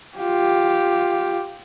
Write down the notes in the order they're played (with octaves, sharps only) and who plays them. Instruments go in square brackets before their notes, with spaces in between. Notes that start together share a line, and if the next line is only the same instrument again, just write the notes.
[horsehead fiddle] F4 G4